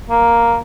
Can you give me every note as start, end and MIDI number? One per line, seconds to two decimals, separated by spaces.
0.10 0.57 58